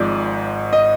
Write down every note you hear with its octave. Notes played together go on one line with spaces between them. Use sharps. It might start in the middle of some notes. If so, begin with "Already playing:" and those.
Already playing: G#1 G#2 F3 G#3 D5
D#5